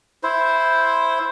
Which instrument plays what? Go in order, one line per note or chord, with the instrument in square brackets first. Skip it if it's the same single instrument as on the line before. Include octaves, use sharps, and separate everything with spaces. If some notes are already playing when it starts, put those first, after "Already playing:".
[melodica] E4 C5